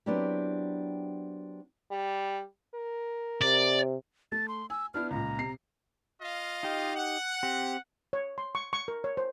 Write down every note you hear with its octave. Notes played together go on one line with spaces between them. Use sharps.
F#3 B3 C4 D4 E4 G4
G3
A#4
C3 D5
A3 A6
C6
G#5 E6
B3 D4 E4 F6
C#2 A#2 A#5
C3 C7
F4 D#5 F5
D#4 G4
F#5
C4 G4
C#5
C6
C#6
C#6
A#4
C#5
C5